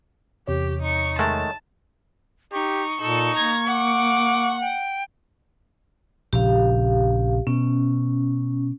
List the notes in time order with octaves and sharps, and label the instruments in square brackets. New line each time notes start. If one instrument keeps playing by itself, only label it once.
[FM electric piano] E2 C3 C#5 [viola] G4
[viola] D#4 C#6
[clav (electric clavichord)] D#3 G#3 A3 [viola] A5
[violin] D#4 [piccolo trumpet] G4 [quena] C#6
[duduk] A#2 [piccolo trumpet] D#4 [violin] A4
[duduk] A#3 [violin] A#5 G#6
[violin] F#5 [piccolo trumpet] D6
[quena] G5
[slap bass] A#1 C#3 [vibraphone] G4 F5
[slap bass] B2 [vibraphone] C#4